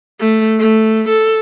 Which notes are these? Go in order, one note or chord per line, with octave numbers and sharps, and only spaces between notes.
A3
A3
A4